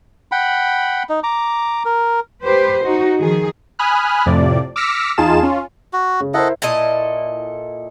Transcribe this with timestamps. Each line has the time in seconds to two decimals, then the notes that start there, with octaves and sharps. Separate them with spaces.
0.32 F#5 G5 B5
1.09 D#4
1.23 A#5 D6
1.85 A#4
2.44 G4 B4 C5
2.84 D#4 F#4
3.19 D#3 F3 G#4
3.79 G#5 B5 D#6 F6 F#6
4.26 F2 A2 C3 F3 D5
4.76 D6 E6 F6 A#6 B6 C#7
5.18 E2 D#4 F4 G#4 A5 E7
5.43 C#4 F4
5.93 F#4
6.20 C#3
6.34 E4 A4 A#4 C5 D#5 F#5
6.62 A#2 E4 A4 D#5